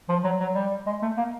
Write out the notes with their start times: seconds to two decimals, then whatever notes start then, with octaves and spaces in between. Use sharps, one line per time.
0.09 F3
0.24 F#3
0.40 F#3
0.55 G3
0.86 G#3
1.02 A3
1.17 A#3